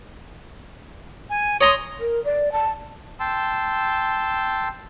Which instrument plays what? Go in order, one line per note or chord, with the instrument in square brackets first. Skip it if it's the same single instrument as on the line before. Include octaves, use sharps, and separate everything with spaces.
[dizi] G#5
[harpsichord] C#5 A#5 C6 [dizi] D#6
[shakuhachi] A#4
D5
A5
[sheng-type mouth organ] G5 A5 C6 E6